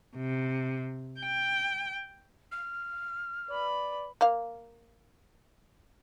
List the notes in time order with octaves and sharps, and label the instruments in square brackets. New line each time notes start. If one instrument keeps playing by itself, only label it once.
[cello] C3
G5
[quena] F6
[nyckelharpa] B4 B5 [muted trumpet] D5
[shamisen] A#3 F5